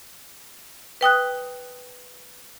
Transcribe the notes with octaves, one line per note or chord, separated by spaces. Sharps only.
B4 G5 D#6 F#6